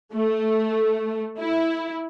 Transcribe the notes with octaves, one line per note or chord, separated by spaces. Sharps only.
A3
E4